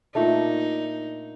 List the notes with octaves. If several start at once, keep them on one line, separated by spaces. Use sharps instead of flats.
A#2 A3 D4 D#4